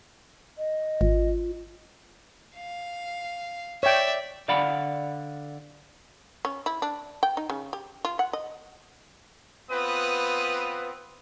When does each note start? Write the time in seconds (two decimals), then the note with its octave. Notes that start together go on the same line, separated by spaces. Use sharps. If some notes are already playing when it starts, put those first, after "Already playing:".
0.58 D#5
1.01 G#1 F4
2.56 F5
3.83 C#5 D5 E5 G5
4.48 D3 D5 F5 F#5 B5
6.45 C#4
6.66 E4
6.82 D4
7.23 G5
7.37 D#4
7.50 C#3
7.73 G4
8.05 F4
8.19 F#5
8.33 D#5
9.71 B3 C4 F4 B4 D#6